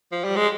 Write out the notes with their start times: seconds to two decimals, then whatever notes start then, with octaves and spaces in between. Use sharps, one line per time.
0.12 F3
0.24 G3
0.36 G#3